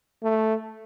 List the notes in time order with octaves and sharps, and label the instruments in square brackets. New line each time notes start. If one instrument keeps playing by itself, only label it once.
[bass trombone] A3